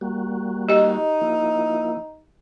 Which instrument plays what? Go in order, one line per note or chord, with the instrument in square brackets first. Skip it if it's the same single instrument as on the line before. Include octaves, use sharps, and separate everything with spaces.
[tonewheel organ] G3 A#3 F#4
[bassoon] D#4 [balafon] G4 D#5
[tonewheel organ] F3 A#3 E4